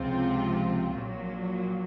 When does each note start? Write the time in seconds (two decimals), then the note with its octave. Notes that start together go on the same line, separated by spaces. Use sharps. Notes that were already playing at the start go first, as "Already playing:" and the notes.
Already playing: C#2 C3 F3 C4 F4
0.92 A#1 A#2 F#3